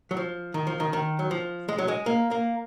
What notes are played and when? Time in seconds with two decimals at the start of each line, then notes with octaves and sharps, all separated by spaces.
0.11 F#3
0.17 F3
0.54 D#3
0.67 F3
0.80 D#3
0.93 D#3
1.19 F#3
1.31 F3
1.69 G#3
1.79 F#3
1.88 G#3
2.06 A#3
2.31 A#3